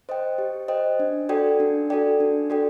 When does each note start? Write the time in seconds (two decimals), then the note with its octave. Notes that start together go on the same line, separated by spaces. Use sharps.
0.09 C5 D#5 G5
0.38 G4
0.68 C5 D#5 G5
0.99 D4
1.29 F#4 A4 D5 G5
1.60 D4
1.90 F#4 A4 D5 G5
2.20 D4
2.50 F#4 A4 D5 G5